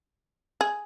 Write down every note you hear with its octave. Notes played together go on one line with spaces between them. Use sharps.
G#4